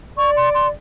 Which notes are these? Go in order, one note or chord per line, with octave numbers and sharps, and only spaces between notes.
D5 C#6
C6
C6